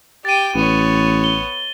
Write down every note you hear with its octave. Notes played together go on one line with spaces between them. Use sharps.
G4 G5 A6 D#7
A1 B3 C#5
G7